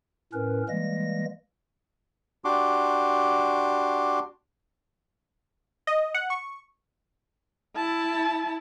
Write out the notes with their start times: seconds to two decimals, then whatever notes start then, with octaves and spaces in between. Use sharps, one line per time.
0.33 A2 C#4 A#4 B4
0.69 E3 G3 G#3 A#3 A#6
2.45 D4 F#4 G4 C6 D6
5.87 D#5
6.14 F#5
6.30 C#6
7.76 E4 A5